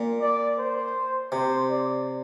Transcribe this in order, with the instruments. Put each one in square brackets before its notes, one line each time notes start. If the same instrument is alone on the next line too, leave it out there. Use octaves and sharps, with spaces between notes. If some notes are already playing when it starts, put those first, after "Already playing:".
Already playing: [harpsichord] A#2
[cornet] D5
C5
[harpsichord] C3 [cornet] C5
[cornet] D5